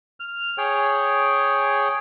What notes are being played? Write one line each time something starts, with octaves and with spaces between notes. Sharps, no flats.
F6
G#4 C#5 G5